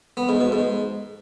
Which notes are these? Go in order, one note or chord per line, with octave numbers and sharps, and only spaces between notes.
B3
G#2
B2
G#2